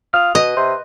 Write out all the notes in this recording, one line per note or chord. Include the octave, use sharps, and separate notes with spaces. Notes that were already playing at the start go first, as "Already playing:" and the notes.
F4 D#6 F6 F7
B2 B4 D#5
C3 C6 G6